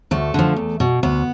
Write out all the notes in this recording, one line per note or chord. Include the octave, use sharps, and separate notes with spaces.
D2 A3
D3 F3
E2
B2
D2 B3